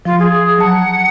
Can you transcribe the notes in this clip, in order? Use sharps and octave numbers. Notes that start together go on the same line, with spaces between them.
F3 F4
G#4
F#3 F#5 A5 A#5